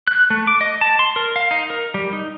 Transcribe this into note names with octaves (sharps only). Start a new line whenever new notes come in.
F#6
A3
D6
D#5
A5
C6
A#4
F5
D#4
A#4
G3
D#4